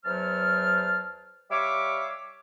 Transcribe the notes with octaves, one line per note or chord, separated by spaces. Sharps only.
E2 F#3 C5 A5 F6
G3 C#5 E5 F5 D6